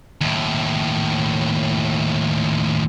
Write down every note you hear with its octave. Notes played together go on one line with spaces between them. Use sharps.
D#2 A2